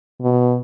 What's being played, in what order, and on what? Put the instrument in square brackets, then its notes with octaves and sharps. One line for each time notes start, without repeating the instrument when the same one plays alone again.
[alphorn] B2